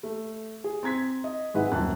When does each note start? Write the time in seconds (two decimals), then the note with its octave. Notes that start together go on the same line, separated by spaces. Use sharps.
0.03 A3
0.64 G#4
0.83 C4 A#5 G#6 B6
1.24 D#5
1.54 G#1 G#3 D#4 B4 E5 F#5
1.72 D#1 F#2 A5 F#6